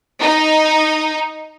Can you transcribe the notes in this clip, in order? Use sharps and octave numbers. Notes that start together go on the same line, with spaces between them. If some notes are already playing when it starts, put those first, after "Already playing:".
D#4